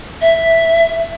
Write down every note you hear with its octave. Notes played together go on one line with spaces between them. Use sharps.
E5